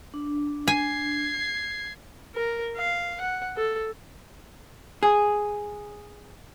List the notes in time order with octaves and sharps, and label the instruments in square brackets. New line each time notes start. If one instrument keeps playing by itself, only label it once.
[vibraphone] D4
[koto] G#5 [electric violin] G#6 C7
[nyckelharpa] A#4
F5
F#5
A4
[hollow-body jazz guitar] G#4